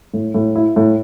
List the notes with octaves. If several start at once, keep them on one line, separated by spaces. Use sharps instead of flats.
A2
A2
E4
A2